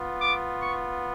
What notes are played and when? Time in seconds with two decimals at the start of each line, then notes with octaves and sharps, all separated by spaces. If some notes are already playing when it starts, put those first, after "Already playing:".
Already playing: B3 F4
0.20 D6
0.60 C#6